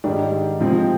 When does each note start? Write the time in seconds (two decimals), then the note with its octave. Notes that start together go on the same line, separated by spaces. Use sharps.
0.04 G#2 D#3 G3 D4
0.60 C3 F3 G#3 C4